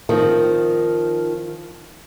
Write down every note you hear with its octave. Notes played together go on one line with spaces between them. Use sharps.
D#3 F3 C4